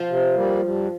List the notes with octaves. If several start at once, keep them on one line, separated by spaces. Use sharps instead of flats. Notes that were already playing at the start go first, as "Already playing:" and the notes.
Already playing: F3
C3
G3 A#3
G2